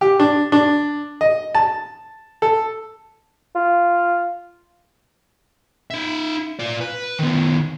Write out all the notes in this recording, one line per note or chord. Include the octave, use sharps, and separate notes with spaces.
G4
D4
D4
D#5
A5
A4
F4
D#4 E5
F4 D5
B4
D#3 B3